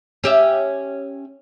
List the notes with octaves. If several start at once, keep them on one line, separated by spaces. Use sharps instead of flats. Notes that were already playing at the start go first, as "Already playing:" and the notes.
C#4 G4 E5